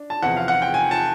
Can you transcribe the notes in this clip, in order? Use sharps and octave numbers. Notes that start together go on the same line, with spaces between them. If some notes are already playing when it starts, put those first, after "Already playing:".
Already playing: D4
A5
E2 C3 F3 F#5
F5
F#5
G5
G#5
A5